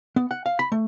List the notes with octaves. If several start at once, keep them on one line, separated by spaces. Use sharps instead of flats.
B3
F#5
F5
B5
A3